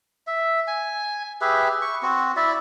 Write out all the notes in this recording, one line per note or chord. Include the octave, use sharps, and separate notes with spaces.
E5
G#5
G4 G#4 B4 E5
C#6
C4 F#4
E4 D5 E5